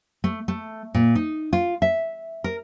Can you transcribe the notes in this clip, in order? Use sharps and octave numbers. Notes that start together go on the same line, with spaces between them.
A3
A3
A#2
D#4
F4
E5
A#4